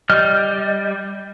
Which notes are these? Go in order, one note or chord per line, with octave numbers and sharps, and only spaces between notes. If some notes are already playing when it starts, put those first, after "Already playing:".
G3 D#5 F6